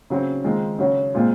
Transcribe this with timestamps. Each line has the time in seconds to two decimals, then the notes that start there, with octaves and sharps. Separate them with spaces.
0.10 C#3 F#3 C4
0.44 D#3 G#3 C4 F4
0.79 C#3 F#3 C#4 F#4
1.14 A#2 G#3 C4 F4